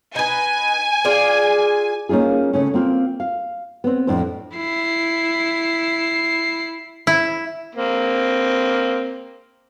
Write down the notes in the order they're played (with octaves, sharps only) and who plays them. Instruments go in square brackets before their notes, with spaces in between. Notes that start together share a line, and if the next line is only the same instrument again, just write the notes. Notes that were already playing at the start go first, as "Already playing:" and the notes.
[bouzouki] D#4 B4 [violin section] G#5
[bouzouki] F4 G#4 D5
[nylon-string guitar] A#3 C#4 D#4 F4 G#4
C#3 A3 C#4
A#3 C4 F4
F5
B3 C4
F2 A2 D4 C5
[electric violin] E4 C7
[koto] E4
[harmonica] A#3 C4